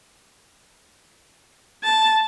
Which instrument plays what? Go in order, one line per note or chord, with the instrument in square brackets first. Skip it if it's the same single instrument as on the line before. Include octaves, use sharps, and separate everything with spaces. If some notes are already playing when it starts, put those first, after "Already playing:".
[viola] A5